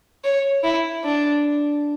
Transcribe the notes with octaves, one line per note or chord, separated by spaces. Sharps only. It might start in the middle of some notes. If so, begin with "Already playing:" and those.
C#5
E4
D4